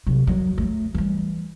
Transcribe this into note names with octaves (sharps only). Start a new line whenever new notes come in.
C3 F#3
D#3 F#3
F#3 A3
E3 G3